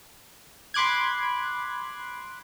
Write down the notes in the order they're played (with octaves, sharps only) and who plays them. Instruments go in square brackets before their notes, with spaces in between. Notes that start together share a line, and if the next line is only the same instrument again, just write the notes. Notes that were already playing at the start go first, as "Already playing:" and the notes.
[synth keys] B5 C6 D6 F#6 G#6